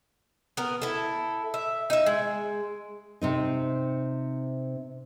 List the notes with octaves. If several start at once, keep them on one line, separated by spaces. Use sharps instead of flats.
B3 A#4
E4 A4
E5
D#4 E5
G#3
C3 C4 D#4